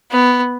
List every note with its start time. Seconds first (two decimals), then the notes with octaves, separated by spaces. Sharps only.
0.11 B3